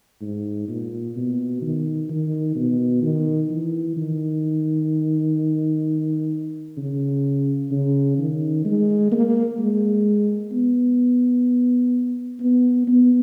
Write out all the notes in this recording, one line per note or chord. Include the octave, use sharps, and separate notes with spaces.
G#2
A#2
B2
D#3
D#3
B2
D#3
E3
D#3
C#3
C#3
D#3
G#3
A#3
G#3
B3
B3
B3